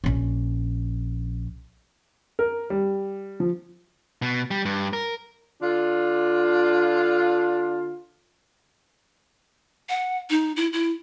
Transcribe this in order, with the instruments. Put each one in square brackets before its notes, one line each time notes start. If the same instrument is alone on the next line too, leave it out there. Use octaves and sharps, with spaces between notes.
[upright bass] A#1 C#4
[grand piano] A#4
G3
F3
[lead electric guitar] B2
G3
G2
A#4
[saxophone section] D3 D4 F4
[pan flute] F#5
D#4
E4
E4